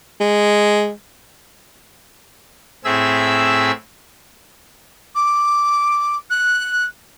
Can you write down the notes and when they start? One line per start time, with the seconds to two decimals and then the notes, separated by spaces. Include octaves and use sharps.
0.20 G#3
2.84 A2 C4 G#4 E5 E6
5.15 D6
6.30 F#6